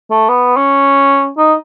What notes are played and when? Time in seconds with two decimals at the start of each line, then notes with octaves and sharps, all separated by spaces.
0.11 A3
0.29 B3
0.57 C#4
1.38 D#4